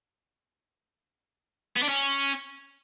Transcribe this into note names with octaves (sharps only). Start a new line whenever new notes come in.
B3
D4
C#4